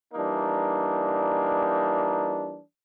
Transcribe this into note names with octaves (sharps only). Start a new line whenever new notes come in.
E3 G3 A#3 D4 D#4